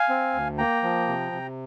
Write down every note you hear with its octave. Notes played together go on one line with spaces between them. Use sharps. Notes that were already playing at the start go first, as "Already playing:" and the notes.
Already playing: F5 G#5
C4
D2
A#3 G5 A#5
F3
C3
C3